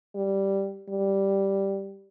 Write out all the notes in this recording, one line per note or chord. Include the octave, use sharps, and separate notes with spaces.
G3
G3